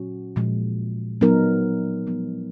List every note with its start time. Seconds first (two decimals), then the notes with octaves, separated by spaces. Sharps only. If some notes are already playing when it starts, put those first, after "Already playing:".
Already playing: A#2 F#3 C#4 F#4
0.36 A#2 F3 G#3
1.21 F#3 B3 D#4 A#4
2.07 F3 G#3 B3